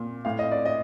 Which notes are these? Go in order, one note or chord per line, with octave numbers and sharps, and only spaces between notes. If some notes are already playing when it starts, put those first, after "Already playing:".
Already playing: A#2
A2 F5
D#5
D5
D#5